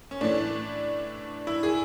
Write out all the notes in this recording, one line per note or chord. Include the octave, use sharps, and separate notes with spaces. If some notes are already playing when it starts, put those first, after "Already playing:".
C#4
A2 E3 A3 D4
E4
G#4